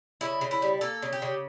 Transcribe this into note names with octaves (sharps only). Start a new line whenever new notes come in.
C#3 E4
C#3
E4
G3
A#3 A4
C#3
G4
C#3